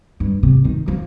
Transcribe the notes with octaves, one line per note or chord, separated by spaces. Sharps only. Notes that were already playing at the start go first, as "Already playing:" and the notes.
G2
C3
D#3
F3